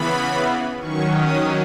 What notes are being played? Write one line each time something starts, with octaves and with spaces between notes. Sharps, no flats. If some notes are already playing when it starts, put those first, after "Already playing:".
Already playing: C#3 E3 B3 B5
D#3 F#3 C#4 C#6
D#6